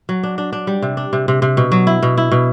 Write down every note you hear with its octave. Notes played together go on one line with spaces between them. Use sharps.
F#3
D4
D4
D4
G3
C3
D4
C3
C3
C3
B2
F#3
E4
B2
E4
B2